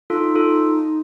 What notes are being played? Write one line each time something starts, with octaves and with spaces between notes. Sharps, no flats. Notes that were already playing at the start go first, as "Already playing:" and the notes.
D#4 F4 A4
F4 A4